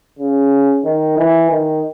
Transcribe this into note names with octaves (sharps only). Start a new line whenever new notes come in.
C#3
D#3
E3
D#3